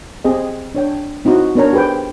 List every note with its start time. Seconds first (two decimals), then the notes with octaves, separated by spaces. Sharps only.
0.25 C4 G4 G#4 D#5
0.75 D4 C#5 G5
1.25 C4 D#4 E4 F#4
1.55 B3 D4 A#4 C#5 A#5
1.73 G4 G#4 B4 C5 G5